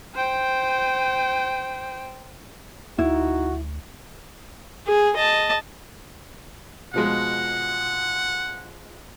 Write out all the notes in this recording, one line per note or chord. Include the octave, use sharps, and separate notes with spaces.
C5 G5
D2 D#4 E4 F#4
G#4
D#5 A5
B2 F3 G#3 F#5